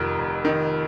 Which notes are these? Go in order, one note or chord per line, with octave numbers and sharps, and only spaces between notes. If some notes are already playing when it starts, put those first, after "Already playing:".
Already playing: F1 F2 D#3 A#4
F1
D#3